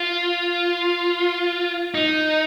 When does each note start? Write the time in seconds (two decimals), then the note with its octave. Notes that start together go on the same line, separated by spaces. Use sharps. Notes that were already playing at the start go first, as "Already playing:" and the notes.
Already playing: F4
1.95 D#4